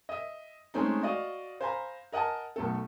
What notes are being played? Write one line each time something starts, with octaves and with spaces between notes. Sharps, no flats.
D#5 E5
G#3 A3 C4 C#4 D#4
F#4 D5 D#5 F5
C5 F5 G#5 A#5 B5
A#4 D#5 F#5 G#5 A5
B1 A3 A4